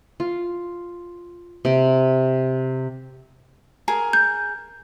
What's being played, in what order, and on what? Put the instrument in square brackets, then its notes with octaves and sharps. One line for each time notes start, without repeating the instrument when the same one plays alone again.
[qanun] F4
C3 G5
[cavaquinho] G#4 A#4
[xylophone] G6